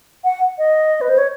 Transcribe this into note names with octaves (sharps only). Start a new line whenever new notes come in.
F#5
D#5
B4
C5
C#5